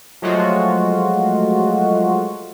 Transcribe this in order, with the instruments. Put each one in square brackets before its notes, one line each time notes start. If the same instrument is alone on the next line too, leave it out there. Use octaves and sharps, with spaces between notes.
[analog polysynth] F3 F#3 G#3 A3 F4 F#4